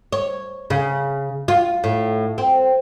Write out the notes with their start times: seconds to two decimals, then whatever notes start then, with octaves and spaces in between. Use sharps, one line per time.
0.13 C#5
0.70 C#3
1.48 F4
1.84 A2
2.38 C4